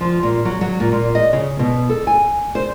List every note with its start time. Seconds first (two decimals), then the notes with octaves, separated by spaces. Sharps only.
0.01 F3
0.23 A#2
0.45 F#3
0.61 F#3
0.80 A#2
0.92 A#2
1.15 D#5
1.33 C#3
1.59 B2
1.89 A4
2.07 G#5
2.55 C5